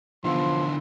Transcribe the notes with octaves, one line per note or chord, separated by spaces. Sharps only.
E2 D3 E3 F3 F5 C6